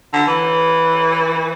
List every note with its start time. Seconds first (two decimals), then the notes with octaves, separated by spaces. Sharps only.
0.13 D3
0.27 E3